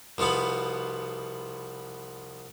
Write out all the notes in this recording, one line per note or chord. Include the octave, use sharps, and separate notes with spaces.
C2 B2 F3 B3 B5